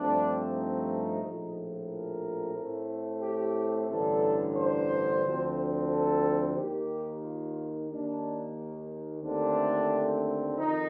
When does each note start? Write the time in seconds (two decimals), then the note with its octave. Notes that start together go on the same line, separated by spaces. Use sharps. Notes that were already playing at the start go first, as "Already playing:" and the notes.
Already playing: G2 F3 A3 C4 D4
0.54 D#4
1.20 A#1 A2 F3
1.88 A#4
2.54 A2 A3 C4
3.21 G4
3.88 A1 G2 D3 A4
4.55 C5
5.22 D2 D3 F3 C4
5.89 A4
6.55 D#2 D#3 A#3 G4
7.23 F4
7.89 D#2 D#3 A#3 D4
9.23 D#2 D3 A3 C4 D4
10.57 F2 D#3 D#4